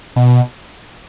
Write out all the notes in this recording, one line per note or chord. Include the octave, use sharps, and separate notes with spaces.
B2